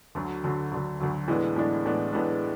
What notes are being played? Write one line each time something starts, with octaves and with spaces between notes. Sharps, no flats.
D2 D3 F#3
D2 D3 F#3
D2 D3 F#3
D2 D3 F#3
A2 E3 G#3 B3 D4
A2 E3 G#3 B3 D4
A2 E3 G#3 B3 D4
A2 E3 G#3 B3 D4